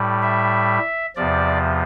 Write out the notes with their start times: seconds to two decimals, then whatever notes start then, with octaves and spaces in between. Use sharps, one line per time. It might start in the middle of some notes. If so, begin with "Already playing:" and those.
Already playing: A2 G3
0.22 E5
1.16 E2 C3 F3 D5